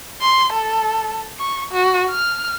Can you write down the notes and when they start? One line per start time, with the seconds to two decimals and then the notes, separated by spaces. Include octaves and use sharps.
0.21 C6
0.53 A4
1.39 C#6
1.72 F#4
2.11 F6